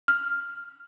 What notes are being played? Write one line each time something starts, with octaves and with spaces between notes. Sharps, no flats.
F6